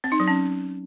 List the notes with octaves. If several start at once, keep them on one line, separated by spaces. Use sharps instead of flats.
C4
D#4
F#3
C#4